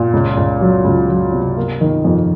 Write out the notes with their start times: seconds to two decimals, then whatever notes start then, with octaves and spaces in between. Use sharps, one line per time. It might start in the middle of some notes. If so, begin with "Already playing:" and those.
Already playing: A#2
0.13 C#2
0.37 C#2
0.61 F#3
0.84 C#2
1.09 F#3
1.32 C3
1.57 A#3
1.81 D#3
2.04 F2